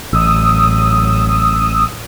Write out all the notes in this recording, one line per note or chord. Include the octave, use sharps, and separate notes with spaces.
A1 A2 F#3 D#6 E6